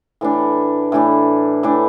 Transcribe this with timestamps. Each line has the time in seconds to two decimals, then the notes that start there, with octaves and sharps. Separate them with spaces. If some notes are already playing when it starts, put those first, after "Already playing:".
0.21 A2 E3 D4
0.92 A2 E3 D4
1.63 A2 E3 D4